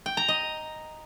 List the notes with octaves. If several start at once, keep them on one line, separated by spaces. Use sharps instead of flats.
G5
A#5
D#5